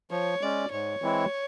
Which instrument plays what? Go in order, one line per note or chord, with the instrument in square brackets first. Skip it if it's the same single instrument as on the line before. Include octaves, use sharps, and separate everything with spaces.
[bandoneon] F3 [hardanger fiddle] C#5
[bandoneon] G#3 C#4 [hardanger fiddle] D5
[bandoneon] G#2 [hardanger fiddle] C#5
[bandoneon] E3 G#3 C4 E4